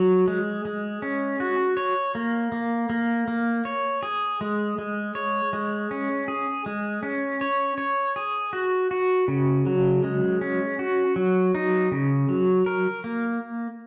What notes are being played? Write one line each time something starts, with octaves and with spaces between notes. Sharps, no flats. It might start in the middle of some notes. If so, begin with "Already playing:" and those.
Already playing: F#3
G#3
G#3
C#4
F#4
C#5
A#3
A#3
A#3
A#3
C#5
G#4
G#3
G#3
C#5
G#3
C#4
G#4
G#3
C#4
C#5
C#5
G#4
F#4
F#4
C#3
F#3
G#3
C#4
F#4
F#3
D#4
C#3
F#3
A#4
A#3